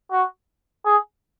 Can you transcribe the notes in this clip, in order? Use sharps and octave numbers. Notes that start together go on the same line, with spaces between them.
F#4
G#4